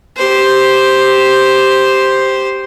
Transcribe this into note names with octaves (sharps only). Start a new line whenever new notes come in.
G4 C5